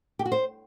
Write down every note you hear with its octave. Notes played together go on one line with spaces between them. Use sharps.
G4
F#4
C5